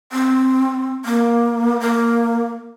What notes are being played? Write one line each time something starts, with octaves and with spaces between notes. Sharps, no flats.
C4
A#3
A#3